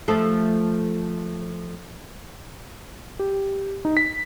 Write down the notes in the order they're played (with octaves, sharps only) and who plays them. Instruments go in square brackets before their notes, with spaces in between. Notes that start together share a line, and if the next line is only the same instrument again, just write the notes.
[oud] F3 A3 A4
[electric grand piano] G4
D#4
B6